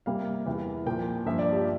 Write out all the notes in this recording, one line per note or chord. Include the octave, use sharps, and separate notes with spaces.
C3 G3 A#3 F5
E2 C3 E3
A#2 F3 A#3 G5
G2 F3 A#3 E5
D5
G4